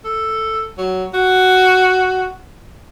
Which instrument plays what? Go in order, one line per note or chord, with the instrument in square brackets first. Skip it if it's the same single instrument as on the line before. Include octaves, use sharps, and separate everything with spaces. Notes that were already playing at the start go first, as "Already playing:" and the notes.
[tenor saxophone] A4
F#3
F#4